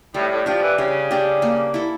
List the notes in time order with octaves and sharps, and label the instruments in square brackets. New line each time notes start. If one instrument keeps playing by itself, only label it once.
[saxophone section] A2 [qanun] G3
[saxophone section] A2
[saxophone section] F3 [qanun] D4 G4
[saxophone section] E3
[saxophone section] C#3 [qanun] G3
[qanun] D4 G4
A#3
E4 A4